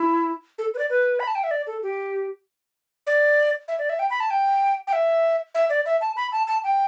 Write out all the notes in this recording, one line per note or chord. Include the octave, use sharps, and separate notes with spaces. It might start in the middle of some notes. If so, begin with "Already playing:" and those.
Already playing: E4
A4
B4
D5
B4
B5
A5
G5
E5
D5
A4
G4
D5
E5
D5
E5
G5
B5
A5
G5
G5
E5
E5
D5
E5
A5
B5
A5
A5
G5